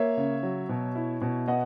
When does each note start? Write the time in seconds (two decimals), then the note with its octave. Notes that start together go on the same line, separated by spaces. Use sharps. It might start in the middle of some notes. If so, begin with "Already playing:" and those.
Already playing: A#3 C#5 E5
0.17 C#3
0.43 F#3
0.69 B2
0.95 E4
1.22 B2
1.48 B3 D#5 F#5